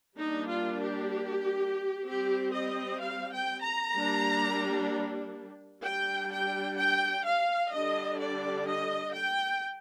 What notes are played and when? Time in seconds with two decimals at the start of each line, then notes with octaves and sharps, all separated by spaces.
0.17 G3 A#3 D4 D#4
0.48 F4
0.81 G4
2.06 G3 C4 G4
2.53 D#5
3.00 F5
3.32 G5
3.63 A#5
3.95 G3 A#3 D4
5.83 G3 D4 G5
6.31 G5
6.78 G5
7.24 F5
7.71 D3 G3 D4 D#5
8.19 D5
8.66 D#5
9.13 G5